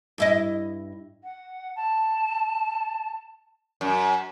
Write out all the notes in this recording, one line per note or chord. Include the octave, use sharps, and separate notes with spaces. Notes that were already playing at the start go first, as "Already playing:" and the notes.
G2 E4 D#5
F#5
A5
F#2